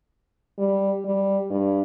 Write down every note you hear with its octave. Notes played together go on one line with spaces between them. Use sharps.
G3
G3
G2